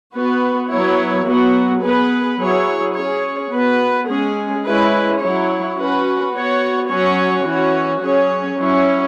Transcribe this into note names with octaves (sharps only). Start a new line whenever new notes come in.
B3 F#4 B4
F#3 B3 E4 C#5
F#3 B3 F#4
B3 G#4 B4
F#3 E4 G#4 C#5
C#4 G#4 C#5
B3 F#4 B4
G#3 C#4 G#4
G#3 C#4 E4 B4
F#3 E4 C#5
C#4 F#4 B4
B3 F#4 C#5
F#3 C#4 F#4 C#5
E3 C#4 F#4 C#5
F#3 C#4 G#4 C#5
F#3 C#4 E4 C#5